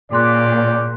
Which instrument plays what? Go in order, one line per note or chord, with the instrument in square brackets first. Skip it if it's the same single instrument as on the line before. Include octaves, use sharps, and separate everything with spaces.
[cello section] A#2 [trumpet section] C#4 G5 D6 [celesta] G#4 C6 F#6 [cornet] D5